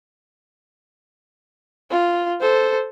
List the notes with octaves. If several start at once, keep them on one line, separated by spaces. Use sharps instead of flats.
F4
A4 C5